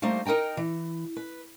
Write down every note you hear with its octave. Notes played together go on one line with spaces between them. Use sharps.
G3 A3 A#3 D#4 C5
D#4 A#4 D#5 G5 A#5
E3
B4